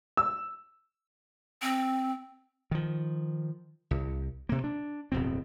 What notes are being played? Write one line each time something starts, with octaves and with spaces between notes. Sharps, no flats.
E6
C4
D#3 F3
C2
C3 A#3
D4
D1 F2 B2 C4